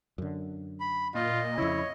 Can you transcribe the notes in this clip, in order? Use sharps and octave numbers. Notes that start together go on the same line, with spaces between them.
F#2 D3
B5
A#2 F4 D#5
F2 C#3 E4 C#5